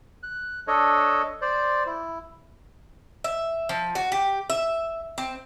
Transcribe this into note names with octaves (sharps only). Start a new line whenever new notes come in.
F#6
D4 A4 C#5 D#5
C5 D5
E4
E5
F3
F#4
G4
E5
C4